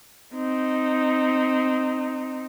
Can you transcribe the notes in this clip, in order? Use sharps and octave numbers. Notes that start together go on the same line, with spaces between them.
C4 D#4